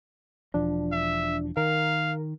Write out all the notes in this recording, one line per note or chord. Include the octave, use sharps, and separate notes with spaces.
E1 F3 D4
E5
D#3 A#4 F5